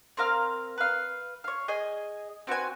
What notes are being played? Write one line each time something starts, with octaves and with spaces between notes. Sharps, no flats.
C4 A#4 F5 F6
B4 F5
C#5 F5
G#4 D#5 G#5
C4 F#4 B4 G#5